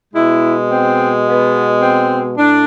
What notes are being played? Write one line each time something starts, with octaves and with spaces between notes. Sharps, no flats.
B2 G#3 E4
C4
B3
C4
A2 D4